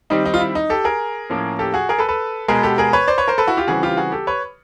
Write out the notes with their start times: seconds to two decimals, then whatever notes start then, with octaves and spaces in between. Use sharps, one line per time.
0.10 D#3 G3 C4 D#4
0.26 D#4
0.34 F4
0.40 E4
0.55 D#4
0.70 G4 A4
0.84 G#4 A#4
1.30 A2 F3 A#3 C#4
1.59 G4 A4
1.74 F#4 G#4
1.89 G#4 A#4
1.98 A4 B4
2.09 A4 B4
2.48 B2 G#3 B3 G#4 A#4
2.63 G4 A4
2.78 G#4 A#4
2.93 B4 C#5
3.08 C5 D5
3.18 B4 C#5
3.28 A#4 C5
3.38 A4 B4
3.47 E4 F#4
3.57 F4 G4
3.67 C#3 E3 G3 C4 F#4 G#4
3.83 F4 G4
3.97 F#4 G#4
4.12 G4 A4
4.27 B4 C#5